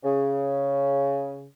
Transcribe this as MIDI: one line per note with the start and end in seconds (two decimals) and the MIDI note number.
0.04 1.44 49